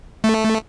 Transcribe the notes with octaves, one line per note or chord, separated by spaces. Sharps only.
A3